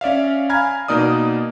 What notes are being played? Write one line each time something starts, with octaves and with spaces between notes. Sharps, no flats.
C#4 D5 E5 F5
F5 G#5 A#5 B5 F6 G#6
B2 A#3 D#4 D5 D#6